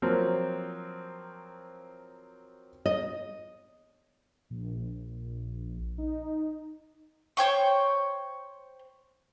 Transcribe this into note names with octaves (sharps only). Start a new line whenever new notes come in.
F3 F#3 A#3 C4
D#5
A#1
D#4
C5 C#5 G5 C#6